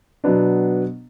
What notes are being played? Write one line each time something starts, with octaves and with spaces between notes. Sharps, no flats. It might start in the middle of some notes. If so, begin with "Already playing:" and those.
B2 F#3 B3 D4